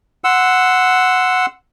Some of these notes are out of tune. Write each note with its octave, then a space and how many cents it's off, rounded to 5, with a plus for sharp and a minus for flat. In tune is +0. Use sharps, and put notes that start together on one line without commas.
F#5 -5 C6 -15 E6 +0